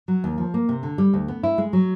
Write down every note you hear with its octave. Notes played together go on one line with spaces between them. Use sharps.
F#3
D#2
F3
A#3
C3
D3
G3
D2
B3
E4
G#3
F#3